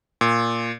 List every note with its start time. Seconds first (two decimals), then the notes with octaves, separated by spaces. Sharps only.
0.21 A#2